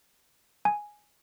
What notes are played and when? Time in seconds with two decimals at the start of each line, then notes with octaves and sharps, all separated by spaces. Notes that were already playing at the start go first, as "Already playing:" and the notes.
0.65 G#5